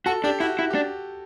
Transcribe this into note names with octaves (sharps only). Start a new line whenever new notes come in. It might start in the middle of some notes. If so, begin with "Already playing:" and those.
F#4 A4
D4 G4
E4 F#4
E4 F#4
D4 G4